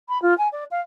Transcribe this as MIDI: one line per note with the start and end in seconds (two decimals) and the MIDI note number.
0.09 0.21 83
0.22 0.37 65
0.38 0.48 80
0.52 0.64 74
0.71 0.81 77